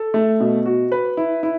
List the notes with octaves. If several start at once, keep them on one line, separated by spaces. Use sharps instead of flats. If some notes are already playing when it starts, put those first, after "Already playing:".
Already playing: A4
A3
B2
F#4
B4
E4
E4